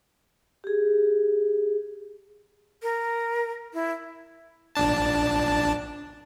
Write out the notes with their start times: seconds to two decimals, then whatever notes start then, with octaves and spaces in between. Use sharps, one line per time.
0.64 G4 G#4
2.82 A#4
3.74 E4
4.75 A#1 D4 A5